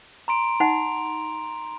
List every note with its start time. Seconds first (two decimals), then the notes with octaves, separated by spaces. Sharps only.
0.28 A#5 C6 D7
0.60 D#4 F#5 F7